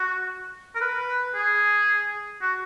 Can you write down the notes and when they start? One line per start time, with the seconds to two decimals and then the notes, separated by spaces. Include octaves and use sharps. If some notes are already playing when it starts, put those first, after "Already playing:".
Already playing: F#4
0.75 A#4
0.81 B4
1.35 G#4
2.42 F#4